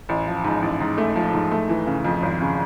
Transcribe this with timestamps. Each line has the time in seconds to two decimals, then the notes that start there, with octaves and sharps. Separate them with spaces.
0.09 A1
0.27 F3
0.44 G#2
0.62 A1
0.80 G#2
0.98 A3
1.16 F3
1.33 G#2
1.51 A3
1.69 E3
1.87 C#3
2.05 F2
2.22 G#1
2.41 C#3